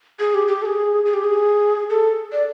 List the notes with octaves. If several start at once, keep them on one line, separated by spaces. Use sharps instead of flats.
G#4
G4
G4
A4
G#4
G#4
G4
G#4
A4
D5